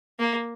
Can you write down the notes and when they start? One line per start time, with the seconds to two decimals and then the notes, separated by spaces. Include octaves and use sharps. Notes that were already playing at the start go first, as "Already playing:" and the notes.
0.19 A#3